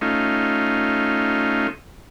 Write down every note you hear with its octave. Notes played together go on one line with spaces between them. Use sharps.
A3 C#4 D#4 F4